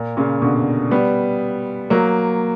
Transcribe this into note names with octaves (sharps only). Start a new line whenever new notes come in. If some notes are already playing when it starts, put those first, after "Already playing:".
Already playing: A#2
A#2 C#3
B2 D3
G3 B3
F#3 A#3